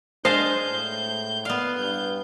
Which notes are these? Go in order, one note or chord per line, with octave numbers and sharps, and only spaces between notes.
G#3 D4 C5 D#5 F5 A5 G6
A2
B3 D5 F5
G2 G6